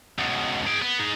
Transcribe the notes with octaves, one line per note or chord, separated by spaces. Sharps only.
C#2 B2
G#4 G5
B3
D#4 G#4